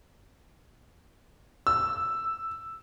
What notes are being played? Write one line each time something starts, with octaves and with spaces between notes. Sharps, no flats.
E6